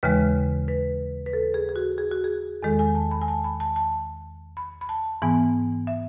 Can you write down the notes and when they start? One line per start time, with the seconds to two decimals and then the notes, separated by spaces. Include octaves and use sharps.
0.03 D#2 C#3 E3 G#3 B4
0.68 B4
1.26 B4
1.33 A4
1.54 G#4
1.69 G#4
1.76 F#4
1.98 G#4
2.11 F#4
2.24 G#4
2.63 E2 D#3 G#3 A4
2.79 G#5
2.95 A5
3.11 B5
3.21 G#5
3.28 A5
3.44 B5
3.60 A5
3.76 A5
4.57 B5
4.81 B5
4.89 A5
5.22 G#2 E3 B3 G#5
5.87 E5